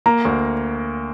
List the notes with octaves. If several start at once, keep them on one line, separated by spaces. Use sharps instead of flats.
A#3 A#5
D2